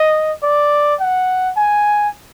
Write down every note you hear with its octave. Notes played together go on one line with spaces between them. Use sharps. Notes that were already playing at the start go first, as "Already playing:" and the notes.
Already playing: D#5
D5
F#5
G#5